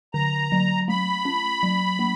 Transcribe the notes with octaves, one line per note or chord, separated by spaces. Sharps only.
D3 A#5
F#3
A3 B5
C#4
F#3
A#3